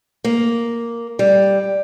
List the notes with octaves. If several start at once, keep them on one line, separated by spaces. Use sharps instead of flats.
A#3
G3